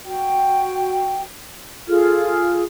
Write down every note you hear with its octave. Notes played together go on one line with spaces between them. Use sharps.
F#4 G5
F4 G#4 A4 F6